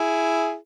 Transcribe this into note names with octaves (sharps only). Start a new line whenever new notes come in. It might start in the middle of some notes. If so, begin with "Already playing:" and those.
Already playing: E4 G#4